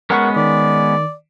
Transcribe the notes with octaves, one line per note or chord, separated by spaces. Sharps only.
G#3 B3 C#4 A#4 F#5 C#6
D#3 D5